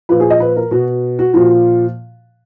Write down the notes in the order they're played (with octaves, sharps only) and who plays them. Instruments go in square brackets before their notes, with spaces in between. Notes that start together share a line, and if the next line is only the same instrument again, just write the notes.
[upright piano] A#2 F3 B4
G#4
D#5
B4
A#4
B2 F#4
F#4
A#2 F3 F#4